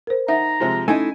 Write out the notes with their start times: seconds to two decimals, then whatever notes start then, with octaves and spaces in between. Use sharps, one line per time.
0.07 A#4 C5
0.28 D#4 E5 F#5 A#5
0.60 C3 F3 G#3
0.88 A3 C#4 D#4 E4 G#5